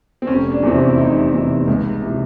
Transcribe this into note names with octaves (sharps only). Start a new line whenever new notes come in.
C4
F1 C#4
D4
E2 C3 E3 C4
C#4
E4
F1 D#4
E2 C3 E3 D#4
C#2
C3 E3